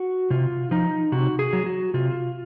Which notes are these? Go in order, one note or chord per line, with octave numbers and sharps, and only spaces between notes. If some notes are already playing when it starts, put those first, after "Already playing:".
Already playing: F#4
C3 F4
F3 D#4
C3 F#4
G#4
F#3
F#4
C3 F4